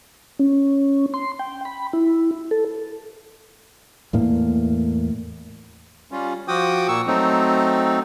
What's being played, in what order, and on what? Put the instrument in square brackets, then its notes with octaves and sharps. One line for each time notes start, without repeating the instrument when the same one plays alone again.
[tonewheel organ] C#4
C6
G5
B5
E4
A4
[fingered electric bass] E2 A2 A#3
[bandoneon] G3 C#4 F4
F3 F#4 G5 D6 D#6
A#2 A#3 C#6 E6
F#3 A3 C4 D#4